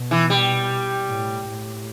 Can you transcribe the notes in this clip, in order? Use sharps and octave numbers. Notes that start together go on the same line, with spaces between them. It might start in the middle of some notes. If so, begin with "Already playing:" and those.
Already playing: B2
E3
G3
A2
A2